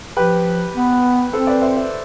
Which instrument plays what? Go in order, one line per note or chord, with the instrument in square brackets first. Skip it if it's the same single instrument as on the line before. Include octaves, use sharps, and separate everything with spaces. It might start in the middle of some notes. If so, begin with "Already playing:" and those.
[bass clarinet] F3 [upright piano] G4 B4
[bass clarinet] B3
[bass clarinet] C4 [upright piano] A4 C5
[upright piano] B4 D5
C5 E5
C5 E5